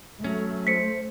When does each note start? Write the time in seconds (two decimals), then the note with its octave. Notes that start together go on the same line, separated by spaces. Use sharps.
0.24 F#3 A3 C#4
0.67 C5 B6 C#7